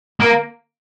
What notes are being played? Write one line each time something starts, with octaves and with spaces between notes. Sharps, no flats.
A#3